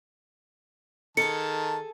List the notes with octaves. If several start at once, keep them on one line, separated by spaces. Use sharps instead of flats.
D#3 G#4 A4 A5 C#7